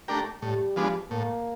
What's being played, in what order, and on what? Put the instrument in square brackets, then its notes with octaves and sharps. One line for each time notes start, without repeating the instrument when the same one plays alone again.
[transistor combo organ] A3 D4 G4 A#4
[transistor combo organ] A2 [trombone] G3
[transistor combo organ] F3 G#3 B3 D4
[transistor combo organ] A2 [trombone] A#3